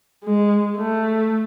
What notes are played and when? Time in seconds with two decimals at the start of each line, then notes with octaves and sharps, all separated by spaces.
0.24 G#3
0.76 A3